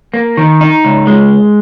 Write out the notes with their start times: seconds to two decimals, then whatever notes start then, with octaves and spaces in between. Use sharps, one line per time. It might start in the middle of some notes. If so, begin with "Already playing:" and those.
0.14 A#3
0.37 D#3
0.61 D#4
0.85 C#2
1.07 G#3